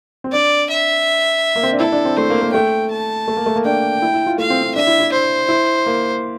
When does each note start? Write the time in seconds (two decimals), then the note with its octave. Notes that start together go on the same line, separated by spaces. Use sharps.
0.24 C4
0.32 D4 D5
0.70 E5
1.56 A#3
1.63 C4
1.72 D4
1.80 E4 A4
1.92 D4
2.05 C4
2.17 A3 C5
2.30 A#3
2.42 A#3
2.54 A3 G5
2.91 A5
3.28 A3
3.37 A#3
3.46 A3
3.56 A#3
3.65 D4 G5
4.02 E4
4.14 E4
4.26 F4
4.38 A3 F5
4.50 C4
4.63 C4
4.75 D4 E5
4.87 E4
5.00 E4
5.13 C5
5.49 E4
5.86 A#3